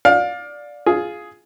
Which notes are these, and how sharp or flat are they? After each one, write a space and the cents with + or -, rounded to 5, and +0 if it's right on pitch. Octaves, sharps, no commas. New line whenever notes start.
D5 +0 F5 +25
F4 +0 G#4 +5